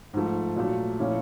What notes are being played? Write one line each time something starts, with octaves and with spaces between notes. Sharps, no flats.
G#2 F3 A3
A#2 F#3 A3
A#2 F3 A3 C#4 E4